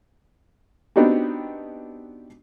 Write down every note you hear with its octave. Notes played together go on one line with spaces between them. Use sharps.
B3 C4 D4 D#4 F#4 G4